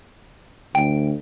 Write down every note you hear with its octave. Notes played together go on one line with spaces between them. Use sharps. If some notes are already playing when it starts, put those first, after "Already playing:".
D2 G5